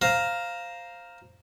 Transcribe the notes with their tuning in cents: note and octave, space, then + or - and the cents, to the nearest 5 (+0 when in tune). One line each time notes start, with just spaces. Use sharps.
C5 +0 F5 +0 A#5 +0